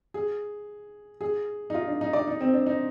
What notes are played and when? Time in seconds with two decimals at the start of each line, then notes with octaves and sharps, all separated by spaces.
0.14 G#4
1.21 G#4
1.70 D#4
1.74 F4
1.88 D4
2.01 D#4
2.13 D5
2.27 D#4
2.41 C4
2.54 D4
2.67 D#4